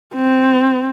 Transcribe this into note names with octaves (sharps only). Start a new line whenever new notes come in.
C4